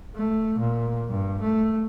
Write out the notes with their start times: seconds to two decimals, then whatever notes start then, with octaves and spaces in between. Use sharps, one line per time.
0.16 A3
0.59 A#2
1.10 G2
1.41 A3